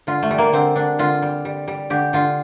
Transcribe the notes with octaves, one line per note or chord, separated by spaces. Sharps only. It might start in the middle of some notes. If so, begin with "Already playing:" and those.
D3 F4
A3
G3
A#3
D3 C4
D3 D4
D3 F4
G3
G3
G3
D3 G4
D3 F4